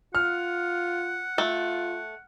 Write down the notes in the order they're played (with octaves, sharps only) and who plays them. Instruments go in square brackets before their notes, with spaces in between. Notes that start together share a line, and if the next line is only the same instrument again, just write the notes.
[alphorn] F4 [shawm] F#5 [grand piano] F6
[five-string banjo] A3 [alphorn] F4